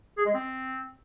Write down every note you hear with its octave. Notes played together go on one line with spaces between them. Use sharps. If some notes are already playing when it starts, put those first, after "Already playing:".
G#4
G#3
C4